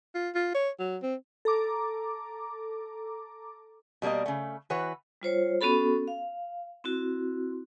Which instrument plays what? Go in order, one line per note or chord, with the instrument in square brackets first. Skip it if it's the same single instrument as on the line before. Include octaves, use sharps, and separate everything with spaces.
[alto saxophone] F4
F4
C#5
F#3
C4
[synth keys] A4 A#5 D6
[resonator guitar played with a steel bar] B2 G3 A#3 A#4 D#5
C#3 A3
E3 F#4 B4 C#5
[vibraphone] G3 F4 C5 C#5
B3 C#4 F#4 A4 B5
F5
C4 E4 F#4